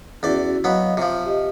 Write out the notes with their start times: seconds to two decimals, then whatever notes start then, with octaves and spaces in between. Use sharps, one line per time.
0.23 E2 C#4 E4 F#4 D5
0.64 F#3 B3 D#5 F5
0.97 C3 F3 F4
1.25 G4 D#5